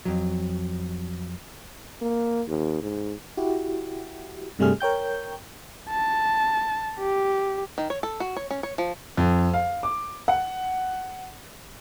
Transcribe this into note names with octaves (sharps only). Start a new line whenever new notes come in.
F2 F#3
A#3
D#2
G#2
E4 F#4 G4
G2 C3 G3 A3 G#4 F6
A#4 C#5 G5 G6
A5
G4
D#3
C#5
A4
F#4
C#5
C#4
C#5
F3
F2
F5
D6
F#5